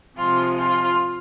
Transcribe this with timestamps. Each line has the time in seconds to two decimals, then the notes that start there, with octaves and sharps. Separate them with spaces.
0.17 C3 F3 G#3 F4
0.59 F4